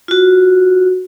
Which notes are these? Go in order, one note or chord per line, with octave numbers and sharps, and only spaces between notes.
F4 F#4